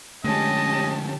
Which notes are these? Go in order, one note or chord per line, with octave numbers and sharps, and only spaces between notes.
D3 F3 G#3 A3 C#4 G4 D#5 A5